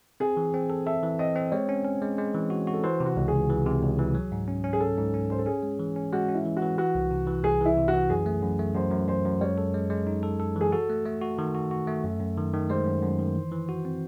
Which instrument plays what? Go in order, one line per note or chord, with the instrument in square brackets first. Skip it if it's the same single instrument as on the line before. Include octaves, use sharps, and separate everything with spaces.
[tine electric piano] C4 [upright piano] G#4
[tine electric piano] E3
C4
A4
[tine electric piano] A4 [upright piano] E5
[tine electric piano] E3
[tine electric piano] C4 [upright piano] D#5
[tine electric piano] C4
[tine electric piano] G#3 [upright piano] C#5
[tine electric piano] C#4
C#4
G#3
G#3
E3
F#4
F#4
[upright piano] A4
[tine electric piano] E3 [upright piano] C5
[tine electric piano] C3
[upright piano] F#4
[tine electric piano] C#2
[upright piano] G#4
[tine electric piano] C#2
E3
C3
C#2
E3
F#3
G#2
C#4
C#4
[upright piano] G#4
[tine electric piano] C#4 [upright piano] A4
[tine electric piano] G#2
C#4
[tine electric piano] C#4 [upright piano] C5
[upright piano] A4
[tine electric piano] C#4 [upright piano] G#4
[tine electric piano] G#3
E3
C#4
[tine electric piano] G#3 [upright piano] F#4
[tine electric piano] C#4
[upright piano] E4
[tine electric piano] E3
[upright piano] F#4
[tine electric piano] E3
[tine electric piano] E3 [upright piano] F#4
[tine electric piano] C2
C3
E3
[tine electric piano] C2 [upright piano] G#4
[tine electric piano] E3 [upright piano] E4
[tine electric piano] C3
[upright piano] F#4
[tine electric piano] E3
[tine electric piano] F#2 [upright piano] G#4
[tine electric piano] A3
F#2
A3
[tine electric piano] F#2 [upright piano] C5
[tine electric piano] F#2
[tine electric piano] F#2 [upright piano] C5
[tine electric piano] F#2
[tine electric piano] G#3 [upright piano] C#5
[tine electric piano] A4
G#3
G#3
D#4
A4
A4
[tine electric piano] E3 [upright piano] G#4
[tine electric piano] F#4 [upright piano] A4
[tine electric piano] A3
A3
F#4
D#3
F#4
F#4
A3
F#2
F#2
D#3
D#3
[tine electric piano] G#3 [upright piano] C5
[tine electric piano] F#2
F#2
D#3
E3
E3
F#4
C4